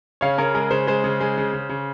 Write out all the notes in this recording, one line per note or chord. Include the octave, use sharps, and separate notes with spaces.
C#3 C#5 F5
C#3 A#4 C#5
G#3 A#4
C#3 C5
G#3 C5
C#3
G#3
C#3
C#3
C#3